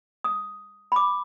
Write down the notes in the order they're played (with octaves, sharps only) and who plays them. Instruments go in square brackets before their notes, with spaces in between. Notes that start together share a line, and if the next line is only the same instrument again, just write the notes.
[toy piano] D#6
B5 D6